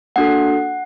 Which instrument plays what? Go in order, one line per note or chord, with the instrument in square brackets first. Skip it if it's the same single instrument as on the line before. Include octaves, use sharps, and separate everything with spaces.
[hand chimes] A#3 D4 F#4 A4 F#5